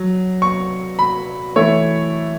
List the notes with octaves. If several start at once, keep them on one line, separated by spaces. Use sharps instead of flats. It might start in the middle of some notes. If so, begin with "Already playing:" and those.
Already playing: F#3
C#6
B5
E3 A3 E4 C#5